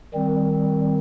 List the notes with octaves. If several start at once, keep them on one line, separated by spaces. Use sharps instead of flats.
D#3 G3 C4